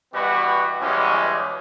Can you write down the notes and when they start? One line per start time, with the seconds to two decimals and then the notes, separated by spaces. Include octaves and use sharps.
0.13 B2 E3 G3 B3 F#4 B4
0.81 F#2 B2 E3 G3 G#3 C#4